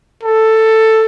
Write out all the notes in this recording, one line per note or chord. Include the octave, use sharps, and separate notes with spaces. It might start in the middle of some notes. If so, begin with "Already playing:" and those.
A4